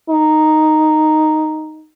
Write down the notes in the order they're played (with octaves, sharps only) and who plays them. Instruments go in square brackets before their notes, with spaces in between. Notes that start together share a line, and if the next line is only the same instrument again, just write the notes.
[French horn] D#4